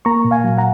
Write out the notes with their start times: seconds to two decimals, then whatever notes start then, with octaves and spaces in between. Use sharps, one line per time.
0.05 A#3 A#5 C#6
0.25 A#2
0.31 F5 G#5
0.44 F#3
0.58 F#5 A#5